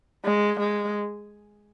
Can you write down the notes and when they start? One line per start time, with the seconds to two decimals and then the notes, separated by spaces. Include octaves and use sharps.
0.25 G#3
0.60 G#3